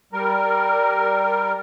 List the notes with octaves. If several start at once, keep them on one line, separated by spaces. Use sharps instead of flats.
G3 A#4